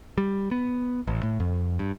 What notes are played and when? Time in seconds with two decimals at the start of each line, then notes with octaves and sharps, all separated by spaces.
0.18 G3
0.51 B3
1.07 A1
1.23 A2
1.40 F2
1.79 G2